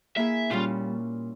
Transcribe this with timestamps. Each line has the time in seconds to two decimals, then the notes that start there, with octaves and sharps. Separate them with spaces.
0.17 A#3 E4 G#4 E5
0.51 A#2 G3 C#4 F4